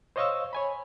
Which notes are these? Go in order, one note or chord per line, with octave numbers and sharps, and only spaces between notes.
C5 C#5 D#5 F5 C#6 E6
C#5 G#5 B5